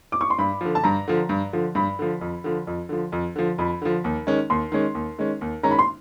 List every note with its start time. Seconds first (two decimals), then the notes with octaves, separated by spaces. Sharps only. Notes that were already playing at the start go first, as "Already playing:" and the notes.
0.12 D6
0.21 C#6
0.30 C6
0.38 G2 B5
0.61 D3 F3
0.75 A5
0.84 G2 A#5
1.08 D3 F3
1.29 G2
1.53 D3 F3
1.75 G2 B5
1.99 D3 F3
2.21 F2
2.44 D3 F3
2.67 F2
2.89 D3 F3
3.12 F2
3.36 D3 F3
3.58 F2 B5
3.82 D3 F3
4.04 D#2
4.27 D#3 G#3 C#4
4.50 D#2 C6
4.72 D#3 G#3 C#4
4.95 D#2
5.19 D#3 G#3 C#4
5.41 D#2
5.63 D#3 G#3 C#4 A#5
5.71 B5
5.79 C6